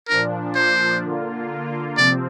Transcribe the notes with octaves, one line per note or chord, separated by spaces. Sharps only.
A#2 F3 D4 A#4
C5
D3 A#3 F4
C3 F3 C4 D5